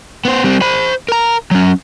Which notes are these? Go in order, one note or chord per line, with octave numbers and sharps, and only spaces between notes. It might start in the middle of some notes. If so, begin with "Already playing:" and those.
B3 C5
G3 C4
C5 B5
A#4 A#5
F#3 C#4